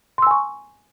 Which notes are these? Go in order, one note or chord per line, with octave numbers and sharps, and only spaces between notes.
G#5 C6 C#6 E6